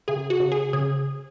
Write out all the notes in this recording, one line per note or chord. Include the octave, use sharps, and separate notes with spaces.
C#3 G#4
F#4
C#3
G#4
C#3 G#4